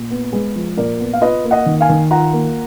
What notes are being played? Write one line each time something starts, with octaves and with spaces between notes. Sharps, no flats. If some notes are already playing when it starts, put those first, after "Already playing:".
Already playing: A#2
B3
G#3 G#4 B4
F3
A#2 A#4 D5
B3
F5
F4 B4 D#5
A#3
D#5 F#5
D#3
F5 G#5
D#3
F4 F#5 A#5
A#3